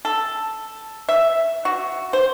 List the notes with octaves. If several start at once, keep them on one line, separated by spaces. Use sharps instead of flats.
A4
E5
F#4
C5